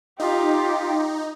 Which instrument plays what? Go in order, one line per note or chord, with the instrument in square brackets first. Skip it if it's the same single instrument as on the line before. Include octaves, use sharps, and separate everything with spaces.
[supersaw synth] D#4 [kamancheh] F4 G4